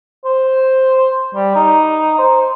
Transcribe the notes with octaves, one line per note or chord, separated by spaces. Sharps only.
C5
G3
D#4
C5